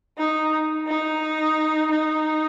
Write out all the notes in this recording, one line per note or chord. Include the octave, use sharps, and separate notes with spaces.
D#4
D#4
D#4